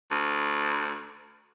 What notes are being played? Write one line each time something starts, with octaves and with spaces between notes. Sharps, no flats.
D2